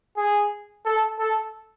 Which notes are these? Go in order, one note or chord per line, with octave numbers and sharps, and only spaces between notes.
G#4
A4
A4